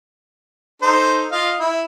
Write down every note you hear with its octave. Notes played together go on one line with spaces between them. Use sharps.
D#4 A4 C5
F4 D#5 F5
E4